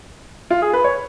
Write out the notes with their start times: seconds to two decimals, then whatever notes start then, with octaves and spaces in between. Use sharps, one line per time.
0.50 F4
0.62 G#4
0.73 B4
0.84 C#5